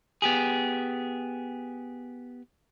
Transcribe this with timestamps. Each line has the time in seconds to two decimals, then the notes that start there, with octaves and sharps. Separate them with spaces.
0.22 B3 G4 G#4